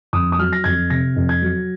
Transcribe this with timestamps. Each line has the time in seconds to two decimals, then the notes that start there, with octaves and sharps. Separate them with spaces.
0.13 F2 D#6
0.32 D#6
0.39 F#3 F6
0.53 A#6
0.64 F2 G#6
0.90 C3 A#6
1.16 F2
1.29 G#6
1.42 F#3